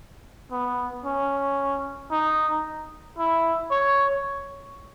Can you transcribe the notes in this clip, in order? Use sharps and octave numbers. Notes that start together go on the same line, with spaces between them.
B3
C#4
D#4
E4
C#5